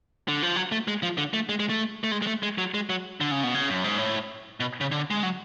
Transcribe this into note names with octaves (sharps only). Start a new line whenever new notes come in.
D3
F3
F#3
A3
G#3
F3
D3
A3
G#3
G#3
A3
A3
G#3
G#3
A3
G#3
F#3
G#3
F#3
D3
C#3
B2
C#3
F#2
G#2
A2
B2
C#3
D3
G#3
F#3